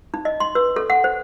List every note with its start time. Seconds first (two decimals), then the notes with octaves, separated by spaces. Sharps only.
0.14 D#4
0.25 D#5
0.40 C6
0.55 B4
0.76 A4
0.90 F#5
1.04 C5